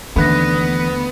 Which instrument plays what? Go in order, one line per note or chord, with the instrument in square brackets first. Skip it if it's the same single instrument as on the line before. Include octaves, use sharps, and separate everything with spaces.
[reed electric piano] D#2 D3 A3 [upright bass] E3 [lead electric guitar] B3 [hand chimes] B5 F#6 A#6